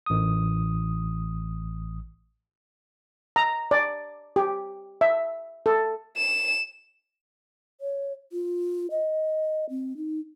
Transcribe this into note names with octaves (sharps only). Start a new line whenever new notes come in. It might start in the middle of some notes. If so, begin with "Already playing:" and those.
A1 D#6
A#5
D5
G4
E5
A4
E7
C#5
F4
D#5
C4
D#4